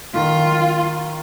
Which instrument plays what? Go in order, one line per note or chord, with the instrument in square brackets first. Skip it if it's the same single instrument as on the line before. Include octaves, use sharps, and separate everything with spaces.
[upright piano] D#3 [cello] F4